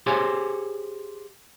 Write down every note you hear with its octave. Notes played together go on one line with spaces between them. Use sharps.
G4 G#4 C5 C#5 G#5